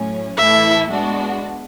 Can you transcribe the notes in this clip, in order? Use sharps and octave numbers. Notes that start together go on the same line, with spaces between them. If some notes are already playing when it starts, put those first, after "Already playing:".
Already playing: A2 F#3 C#4
A2 E3 A3 E4 A4 E5
G#3 B3 D4 F#4